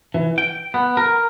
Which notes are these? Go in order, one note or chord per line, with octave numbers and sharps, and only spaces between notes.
E3
G5
B3
A#4